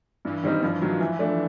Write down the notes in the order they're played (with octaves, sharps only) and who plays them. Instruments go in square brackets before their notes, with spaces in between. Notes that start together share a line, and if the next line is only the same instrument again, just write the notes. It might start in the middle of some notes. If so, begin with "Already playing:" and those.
[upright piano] G2 [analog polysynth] E3
[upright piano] D#3 G3 C4 D#4
[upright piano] G2 [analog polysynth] F3
[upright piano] D#3 F#3
E3
A3 D4